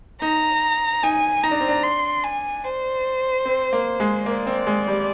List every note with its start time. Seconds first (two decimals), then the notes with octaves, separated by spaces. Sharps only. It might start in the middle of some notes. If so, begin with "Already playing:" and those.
0.21 D#4 A#5
1.03 D#4 G#5
1.43 D#4 A#5
1.51 D4
1.61 C4
1.68 D4
1.84 C6
2.24 G#5
2.64 C5
3.46 C4
3.73 A#3
4.00 G#3
4.26 A#3 D5
4.47 C4
4.67 G#3
4.88 G3